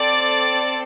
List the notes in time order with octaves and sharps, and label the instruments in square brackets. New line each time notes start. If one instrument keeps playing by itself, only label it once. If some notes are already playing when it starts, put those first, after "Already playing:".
Already playing: [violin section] C4 A4 D5